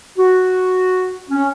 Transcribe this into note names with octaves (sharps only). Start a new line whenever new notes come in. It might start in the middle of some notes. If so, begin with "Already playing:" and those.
F#4
C#4